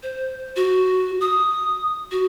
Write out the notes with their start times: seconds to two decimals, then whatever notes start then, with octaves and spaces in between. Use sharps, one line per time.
0.03 C5
0.56 F#4
1.21 D#6
2.11 F#4